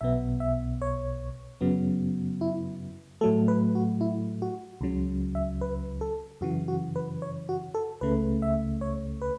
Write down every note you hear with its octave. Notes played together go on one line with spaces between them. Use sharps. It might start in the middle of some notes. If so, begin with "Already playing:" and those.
B1 B2 B3 E5
E5
C#5
F#2 C#3 F#3 B3
E4
A2 F#3 A3 A4
B4
F#4
E4
F#4
C#2 C#3 F#3
E5
B4
A4
F#2 C#3 E3 F#4
F#4
B4
C#5
F#4
A4
C#2 C#3 A3 B4
E5
C#5
B4